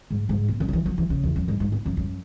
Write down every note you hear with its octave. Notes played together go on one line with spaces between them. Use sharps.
G#2
G#2
B2
C#3
F#3
E3
F#3
E3
C#3
E2
F#2
G#2
G#2
B2
F#2
F#2